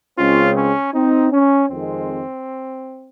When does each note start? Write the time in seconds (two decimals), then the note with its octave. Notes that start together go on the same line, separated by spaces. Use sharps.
0.18 C#2 C#3 G#3 C4 C#4 F4
0.56 C#4
0.93 C4 D#4
1.32 C#4
1.69 F2 D#3 G#3 C4